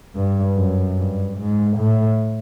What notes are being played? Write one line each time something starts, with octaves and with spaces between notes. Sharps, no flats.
G2
F#2
G2
G#2
A2